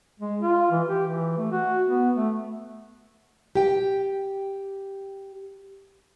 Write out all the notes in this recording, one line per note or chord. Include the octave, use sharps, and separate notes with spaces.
G#3
F4
E3
G4
E3
A3
F#4
B3
A3
G4 G5